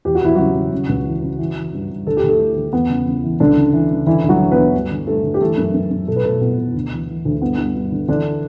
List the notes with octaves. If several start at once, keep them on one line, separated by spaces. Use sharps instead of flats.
E2 G4
F#4
E2 E4
C#3 F#3 F#4
C#3
C#3
C#2
E3
C#3
E3
E3
G2
G2
D2 A4
G4
D2
A3 A4
D3
D3
E2 B3
C#3
C#3
E3
C#2 D3 D4
C#3
E3
C#3
D3 E3 E4
D2
F#3 F#4
D3
B3 B4
D2
G2
D3
G2 A3 A4
D3
G4
E3 A3 A4
F#2
F#2
F#2
B2 A4
B4
B2 A3 A4
B2 B3
B2
D2
E3
E3
D2
G2 B3
G2
G2
D3
D3 E3 D4